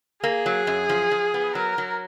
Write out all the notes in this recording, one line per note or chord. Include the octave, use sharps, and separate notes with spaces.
A#3 G#4
F#3
F#2
F3
F3
B3
F#3 A#4
F#3